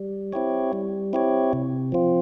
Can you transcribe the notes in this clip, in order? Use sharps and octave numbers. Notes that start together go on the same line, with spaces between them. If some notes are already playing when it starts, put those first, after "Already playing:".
Already playing: G3
C4 E4 G4 C#5
G3
C4 E4 G4 C#5
C3
F3 C4 F4